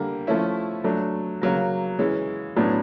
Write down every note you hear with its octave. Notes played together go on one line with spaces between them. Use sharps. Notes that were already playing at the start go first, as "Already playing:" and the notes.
Already playing: D3 G3 A#3
F3 A3 C#4 E4
F#3 A3 D4
C#3 F#3 A#3
E3 G#3 C#4
A2 F#3 B3 D4